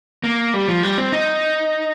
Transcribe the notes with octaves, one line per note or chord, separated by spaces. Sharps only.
A#3
G3
F3
G3
C4
D#4